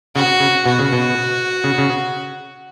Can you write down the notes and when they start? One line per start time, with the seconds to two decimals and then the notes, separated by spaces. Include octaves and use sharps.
0.15 C#3 F#4
0.40 C#3
0.66 B2 F#4
0.79 C#3
0.93 B2
1.64 C#3
1.78 C#3